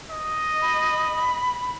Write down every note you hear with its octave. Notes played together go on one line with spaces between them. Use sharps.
D#5
B5